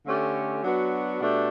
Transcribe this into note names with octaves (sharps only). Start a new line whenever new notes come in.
D3 A3 C#4 G4
F#3 B3 D4 F#4
B2 A3 D4 G4